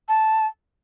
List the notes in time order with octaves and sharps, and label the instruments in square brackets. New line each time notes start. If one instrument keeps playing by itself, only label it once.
[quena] A5